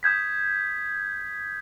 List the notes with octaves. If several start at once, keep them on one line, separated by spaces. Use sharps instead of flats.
D#6 G6 G#6 B6